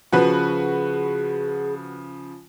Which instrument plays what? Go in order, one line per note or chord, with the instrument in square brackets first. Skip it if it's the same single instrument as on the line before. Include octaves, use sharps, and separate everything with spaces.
[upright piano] C#3 F3 [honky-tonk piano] F#4 B4 [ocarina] G#4